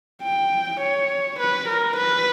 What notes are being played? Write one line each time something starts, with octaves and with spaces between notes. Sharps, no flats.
G5
C#5
B4
A#4
B4